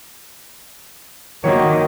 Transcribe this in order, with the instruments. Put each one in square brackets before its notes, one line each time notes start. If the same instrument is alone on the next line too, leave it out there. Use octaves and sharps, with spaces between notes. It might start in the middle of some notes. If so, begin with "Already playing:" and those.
[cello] D#3 [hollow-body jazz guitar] A#3 F#4 C#5